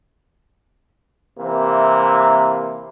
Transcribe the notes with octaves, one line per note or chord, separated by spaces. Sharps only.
C3 E3 A#3